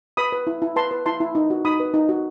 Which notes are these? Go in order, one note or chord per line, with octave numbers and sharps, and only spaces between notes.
B4 B5 D#6
B4
E4
E4
B4 A5 C6
B4
E4 A5 C6
E4
D#4
F#4
D#4 B5 D#6
B4
D#4
F#4